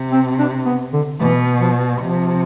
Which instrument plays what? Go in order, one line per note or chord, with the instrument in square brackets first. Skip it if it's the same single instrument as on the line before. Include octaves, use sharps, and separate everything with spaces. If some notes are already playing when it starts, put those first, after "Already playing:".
Already playing: [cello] C3
[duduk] C4
D4
B3
D3
[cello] B2 [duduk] E3
[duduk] F3
[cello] C3 [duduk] F3